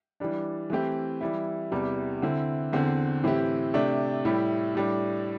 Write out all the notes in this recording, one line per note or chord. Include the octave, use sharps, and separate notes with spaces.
E3 G3 D4
E3 A3 C4 E4 G4
E3 G3 E4
E2 C3 E3 G3
D3 C4 E4
E2 D3 C4
A2 E3 C4 E4 G4
C3 A3 D4 G4
A2 G3 E4 G4
A2 G3 D4